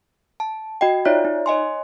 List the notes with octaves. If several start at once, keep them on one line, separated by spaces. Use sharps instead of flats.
A5
F#4 D#5 G5
D#4 F4 C#5 D5 E5
D#4
C#5 D#5 G#5 C6